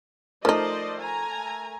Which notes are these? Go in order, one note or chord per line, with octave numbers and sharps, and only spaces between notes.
F3 A3 D#4 A#4 C5 D5 D#5
G#5 A#5